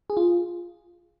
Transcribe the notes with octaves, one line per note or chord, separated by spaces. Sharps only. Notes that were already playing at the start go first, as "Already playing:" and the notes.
G#4
F4